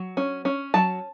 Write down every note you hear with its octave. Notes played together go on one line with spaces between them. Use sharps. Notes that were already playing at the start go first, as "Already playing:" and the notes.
Already playing: F#3
C#4
C#4
F#3 A5